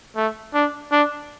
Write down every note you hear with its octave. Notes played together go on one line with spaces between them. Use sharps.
A3
D4
D4